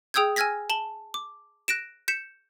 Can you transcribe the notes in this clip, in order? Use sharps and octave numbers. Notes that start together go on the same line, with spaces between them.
G#4 G5 D#6 E6 G6 G#6
G#5 E6 F6 G#6 A#6 B6
A5 F#7 G7
D6
F#6 A#6 D7 E7
G6 B6 C#7 E7